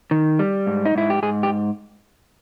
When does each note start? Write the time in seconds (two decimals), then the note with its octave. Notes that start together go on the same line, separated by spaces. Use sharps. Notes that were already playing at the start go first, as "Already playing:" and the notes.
0.11 D#3
0.39 G3
0.67 G#2
0.86 D#4
0.95 G#2 E4
1.10 G4
1.22 G#2 G#4
1.43 G4